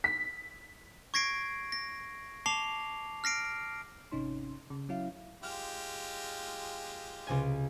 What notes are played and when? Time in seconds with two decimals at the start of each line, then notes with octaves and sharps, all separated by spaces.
0.04 B6
1.14 C#6 G#6 A#6 C7 D7
1.72 A#6
2.46 A5 D6 C7 F7 G7
3.24 F6 A#6 C7 D7
4.12 G#1 C3 C#4 D#4 C6
4.70 C#3
4.89 F#3 C#4 E4 F5
5.43 G#3 F4 G4 F6
7.27 C#2 C3 G#5